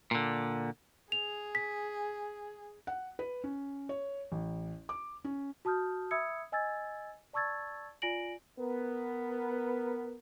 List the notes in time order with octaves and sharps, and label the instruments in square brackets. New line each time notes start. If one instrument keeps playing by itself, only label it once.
[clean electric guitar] A#2 D3
[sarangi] G#4 [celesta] F7
[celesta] B6
[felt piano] F#5
B4
C#4
C#5
A1
D6
C#4
[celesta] F#4 A5 D#6 F6 G6
E5 B5 D#6 E6 G#6 C#7
D#5 G#5 E6 G#6 A6
D5 A5 C#6 E6 G#6 A6
F4 D5 G#5 A#6 D7 F#7
[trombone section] B3 A#4